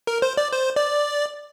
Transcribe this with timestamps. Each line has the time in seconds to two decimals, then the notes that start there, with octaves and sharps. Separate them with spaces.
0.07 A#4
0.22 C5
0.37 D5
0.53 C5
0.76 D5